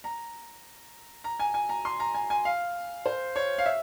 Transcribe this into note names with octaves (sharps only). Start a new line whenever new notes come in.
A#5
A#5
G#5
G#5
A#5
C6
A#5
G#5
G#5
F5
C5
C#5
F5
E5